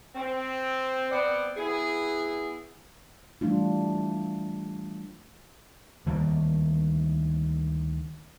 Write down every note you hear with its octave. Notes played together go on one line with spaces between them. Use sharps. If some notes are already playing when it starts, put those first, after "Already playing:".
C4
B3 C4 D5 F#5
B3 E4 G#4
E3 G3 A3 D4 F4
D2 D#3 G3 A#3